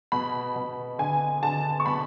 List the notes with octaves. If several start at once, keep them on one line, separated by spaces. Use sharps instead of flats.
B2 B5
B2
D3 G#5
D3 A5
C#6
B2 B5